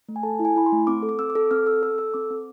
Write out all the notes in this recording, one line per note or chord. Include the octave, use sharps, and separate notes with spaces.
A3
G#5
A4 A5
E4
G#5
E4 B5
C6
A3
C4 D6
A4
D6
C4 E6
D6
A4
C4 F6
A4 E6
A4 E6
A4 E6
C4 D6
C4